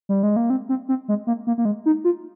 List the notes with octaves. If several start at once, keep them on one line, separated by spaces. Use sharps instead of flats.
G3
G#3
A#3
C4
C4
C4
G#3
A#3
A#3
A#3
G#3
D#4
F4